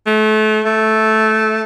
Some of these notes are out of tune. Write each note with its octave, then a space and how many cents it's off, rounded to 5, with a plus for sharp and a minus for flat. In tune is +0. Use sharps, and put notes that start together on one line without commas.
A3 -30
A3 -10